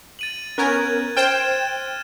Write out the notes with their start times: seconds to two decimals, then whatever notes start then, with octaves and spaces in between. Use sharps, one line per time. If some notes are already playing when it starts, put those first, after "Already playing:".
0.19 A6 D#7 F#7
0.58 B3 C#4 A#4 F#6 G#6
1.17 C5 G5 F6 A6 E7